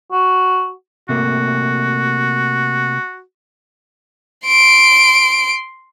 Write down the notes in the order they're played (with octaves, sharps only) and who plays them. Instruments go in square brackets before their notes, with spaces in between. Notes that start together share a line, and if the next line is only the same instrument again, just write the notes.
[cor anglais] F#4
[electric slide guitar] C3 A3 A#3 [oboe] F#4
[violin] C6 D7